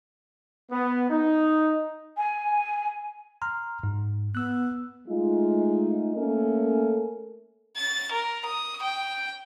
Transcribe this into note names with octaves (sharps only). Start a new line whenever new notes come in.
B3
D#4
G#5
A#5 C6 F6
G#2
B3 E6 F#6
G#3 A3 D#4 F4
A3 A#3 C#4 A4 A#4
A6
A#4
D#6
G5